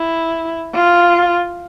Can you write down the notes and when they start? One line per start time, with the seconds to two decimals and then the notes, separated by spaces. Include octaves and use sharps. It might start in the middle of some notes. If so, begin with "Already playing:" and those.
Already playing: E4
0.74 F4